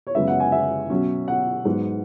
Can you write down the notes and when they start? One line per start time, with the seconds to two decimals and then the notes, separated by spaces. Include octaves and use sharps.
0.07 C#5
0.15 F#2 C#3 G#3 B3 E5
0.28 F#5
0.40 G#5
0.52 E5
0.90 B2 F#3 C#4
1.28 F#5
1.65 G#2 F#3 B3